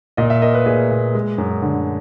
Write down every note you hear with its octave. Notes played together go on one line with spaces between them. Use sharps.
A#2 D#5
E5
A#3 D#5
B4
A#2 G#4
A#2
G#3
F#2
D3